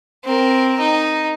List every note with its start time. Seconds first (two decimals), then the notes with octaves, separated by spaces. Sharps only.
0.24 C4 A#4
0.80 D#4